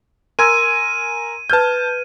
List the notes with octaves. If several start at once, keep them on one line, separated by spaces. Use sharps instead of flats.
A#4 G#5 C6 E6 G#6 D#7
B4 A5 F6 G6 G#6